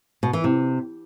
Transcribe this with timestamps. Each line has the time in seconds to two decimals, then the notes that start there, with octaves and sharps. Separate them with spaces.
0.23 B2
0.33 E3
0.44 C3